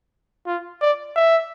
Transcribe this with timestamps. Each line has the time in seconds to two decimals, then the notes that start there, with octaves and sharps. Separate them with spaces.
0.47 F4
0.81 D5
1.16 E5